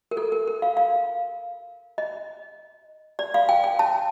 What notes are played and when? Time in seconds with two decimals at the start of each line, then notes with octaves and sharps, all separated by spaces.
0.11 A#4
0.17 A4
0.32 A#4
0.47 A#4
0.62 F5
0.77 F5
1.98 D#5
3.19 D5
3.34 F5
3.49 G5
3.64 G5
3.79 A5